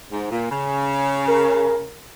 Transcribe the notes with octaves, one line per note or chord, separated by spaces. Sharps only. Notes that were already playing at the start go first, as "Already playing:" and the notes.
G#2
A#2
C#3
A#4